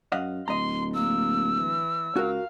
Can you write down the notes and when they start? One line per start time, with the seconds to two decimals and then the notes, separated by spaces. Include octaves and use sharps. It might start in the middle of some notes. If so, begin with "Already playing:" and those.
0.12 F#2 D#5 F5 F#5
0.48 D1 D#5 A#5 C6
0.94 A#3 E6
1.58 E3
2.16 C#2 F#4 A#4 F5